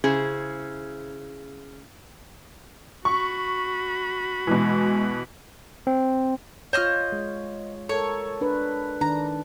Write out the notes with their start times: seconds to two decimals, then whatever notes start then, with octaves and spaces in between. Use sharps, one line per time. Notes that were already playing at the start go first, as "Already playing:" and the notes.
0.04 C#3 E4 G#4 C5
3.05 F#4 B5 C#6
4.47 B2 E3 G#3
5.87 C4
6.73 F4 C5 C#5 D#5 F6
7.12 G#3
7.89 A4 A#4 C#5
8.41 D4 B4
9.01 D#3 D4 A#5